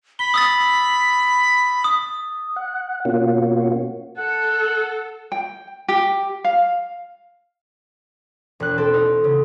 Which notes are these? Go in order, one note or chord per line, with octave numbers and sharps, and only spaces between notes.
B5 G7
D#6 E6 A6
D#6
F#5
B2 A#3 C#4 F4 F#4
A4 F#5
G5
G4
F5
E1 F#6
C4 A4
D#4
C#3